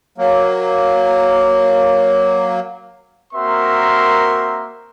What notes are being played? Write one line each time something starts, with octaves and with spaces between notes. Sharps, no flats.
F#3 A#3
A#3 C4 F#4 A#4 E5 C6